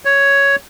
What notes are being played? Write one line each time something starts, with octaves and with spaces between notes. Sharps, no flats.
C#5